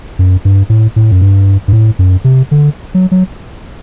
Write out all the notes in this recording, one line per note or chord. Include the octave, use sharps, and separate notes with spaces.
F#2
G2
A2
A2
F#2
G2
G2
A2
F#2
C3
D3
F#3
F#3